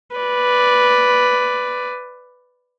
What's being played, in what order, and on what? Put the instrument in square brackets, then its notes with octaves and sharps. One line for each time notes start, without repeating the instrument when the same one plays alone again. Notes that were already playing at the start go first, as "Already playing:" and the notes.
[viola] B4 D5